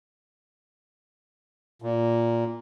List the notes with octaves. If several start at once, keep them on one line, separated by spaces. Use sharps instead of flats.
A#2